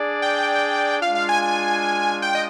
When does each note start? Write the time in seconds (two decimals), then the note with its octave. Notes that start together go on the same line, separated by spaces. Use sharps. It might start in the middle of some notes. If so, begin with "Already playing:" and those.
Already playing: D4 G#4 D5
0.22 G5
1.02 G#3 D4 F4 F5
1.15 F5
1.29 G#5
1.42 G#5
2.22 G5
2.35 D#5